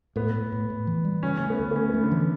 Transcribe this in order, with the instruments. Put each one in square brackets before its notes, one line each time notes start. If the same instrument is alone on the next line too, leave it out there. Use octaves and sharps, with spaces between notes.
[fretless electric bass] A2 [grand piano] B3
[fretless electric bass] A2
A2
A2
E3
G3
[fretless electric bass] C#3 [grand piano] C#4
[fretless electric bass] A3 [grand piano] C#4
[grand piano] B3
[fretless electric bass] D2
[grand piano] B3
[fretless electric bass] A3 [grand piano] C#4
[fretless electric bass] A3 [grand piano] B3
[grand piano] D3
[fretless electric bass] E3